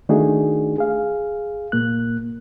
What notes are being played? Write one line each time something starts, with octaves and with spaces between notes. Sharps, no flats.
D#3 A3 D4 D#4 F#4 G#4
G#4 F5
A#2 A#3 F#6